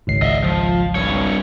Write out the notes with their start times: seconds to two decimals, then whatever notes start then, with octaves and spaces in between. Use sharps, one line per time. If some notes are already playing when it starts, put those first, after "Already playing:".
0.07 G#1 C#2 C7
0.22 D#5 E5
0.43 F3
0.95 G2 C#5